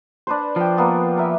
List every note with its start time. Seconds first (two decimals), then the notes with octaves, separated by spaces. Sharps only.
0.27 D4 B4 C5
0.56 F3 G5 A5
0.77 A#3 B3 F5
1.17 A#4 E5 G#5